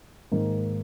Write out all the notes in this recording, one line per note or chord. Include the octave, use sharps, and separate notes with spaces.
G#2 D#3 A#3 D#4